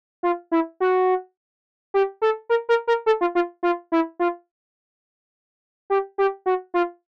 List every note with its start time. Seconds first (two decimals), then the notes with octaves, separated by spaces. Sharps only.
0.23 F4
0.52 E4
0.80 F#4
1.94 G4
2.22 A4
2.49 A#4
2.69 A#4
2.87 A#4
3.06 A4
3.21 F4
3.35 F4
3.63 F4
3.92 E4
4.19 F4
5.90 G4
6.18 G4
6.46 F#4
6.74 F4